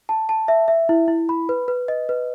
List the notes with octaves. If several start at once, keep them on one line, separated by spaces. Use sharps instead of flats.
A5
A5
E5
E5
E4
E4
B5
B4
B4
D#5
B4